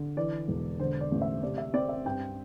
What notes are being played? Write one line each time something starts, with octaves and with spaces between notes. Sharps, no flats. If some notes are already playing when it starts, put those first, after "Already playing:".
Already playing: D3
E3 D5
E1
D3 C5
D5
A1
E5
C3 D5
E5
C4 D5
E5
G2 G5